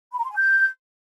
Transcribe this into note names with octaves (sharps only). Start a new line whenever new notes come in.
B5
A#5
C6
G#5
G6